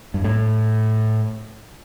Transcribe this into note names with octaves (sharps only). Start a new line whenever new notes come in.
G2
A2